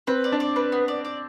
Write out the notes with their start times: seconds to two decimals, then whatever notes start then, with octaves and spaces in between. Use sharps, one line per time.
0.07 C4 B4
0.24 D5
0.32 D4
0.40 D5
0.56 B4
0.72 B3
0.88 D5
1.05 D5